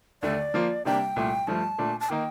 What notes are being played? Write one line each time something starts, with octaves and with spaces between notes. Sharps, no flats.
D#2 D3 A3 D5
F3 A#3 F4
C3 G3 A#3 D4 G4 G5
C2 A#2 A3
G2 F3 A3 A5
A#2 A3 D4
A5
D#3 A#3 D#4 G5